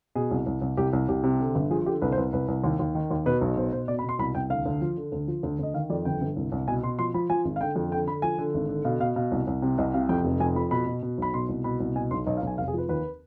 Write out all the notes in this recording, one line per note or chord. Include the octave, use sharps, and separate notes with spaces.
B2 G#4
C2
C2
C2
C2 G4
C2
C2 G4
C3
D3
G1
F3 G#4
D3 G4
C2 B4
C5
C2 B4
C2 B4
C2
D#2
D#2
D#3
D#2
B2 B4
B1
B2 C5
B2 C5
B2 D5
B5
B2 C6
C2 B5
C2 G5
D2 F5
D2
F3
D3
D2
F3
D2
D2 D#5
D#3 F5
F2 D5
G1 G5
G1
C2
C2
B2 G#5
B2 C6
F3 C6
F3 B5
F3 G#5
G#1
F5
D3 G5
F2
D3 G5
D3 B5
F3 G#5
D3
G#1
D3
B2 F5
B2 F5
B2 F5
C2
C2
C3
C2 D#5
C3 F5
F2 G5
F1
F2 G#5
F3 B5
B2 B5
B2
B2
B1 B5
B2 C6
C2
B2 B5
C2
B2 G#5
B1 C6
B1 D#5
F5
B1 G#5
F1 F5
G#4
F3 B4
D#2 B4